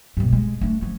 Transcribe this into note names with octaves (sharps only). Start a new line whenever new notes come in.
G2 B2
G#3
A3 D4
F3 C#4